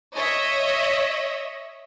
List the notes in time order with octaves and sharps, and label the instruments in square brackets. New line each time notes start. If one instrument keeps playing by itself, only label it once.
[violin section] C#5 D#5 E5